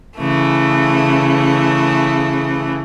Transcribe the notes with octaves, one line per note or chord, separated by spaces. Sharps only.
C#3 E3 A3